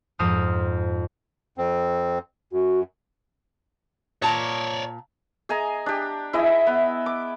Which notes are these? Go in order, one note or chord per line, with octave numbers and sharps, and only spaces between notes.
F2 G#2 C5 D#6 F6
F2 C4
F#2 F#4
A#2 C#5 D5 A5 A#5
G#4 D#5 G#5 A#5
D4 G4
E4 G#4 D#5 E5
B3
D6